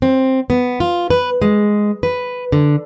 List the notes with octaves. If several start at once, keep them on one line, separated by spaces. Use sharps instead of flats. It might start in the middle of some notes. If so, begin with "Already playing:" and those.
C4
B3
F4
B4
G#3
B4
D3